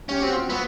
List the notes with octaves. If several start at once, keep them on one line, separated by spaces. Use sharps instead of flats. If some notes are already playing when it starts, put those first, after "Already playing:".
C#4 G4
C4 F#4
F4
F#4
B3